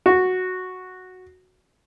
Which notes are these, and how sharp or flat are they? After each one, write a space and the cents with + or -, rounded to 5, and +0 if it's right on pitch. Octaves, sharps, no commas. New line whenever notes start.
F#4 -5